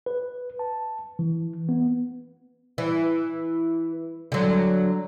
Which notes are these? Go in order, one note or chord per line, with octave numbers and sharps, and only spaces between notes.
B4
A5
E3
B3
E3
D3 F#3